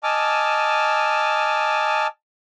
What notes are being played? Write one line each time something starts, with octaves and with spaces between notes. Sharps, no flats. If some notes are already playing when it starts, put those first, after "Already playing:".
D#5 G#5 A5 D6 E6 F6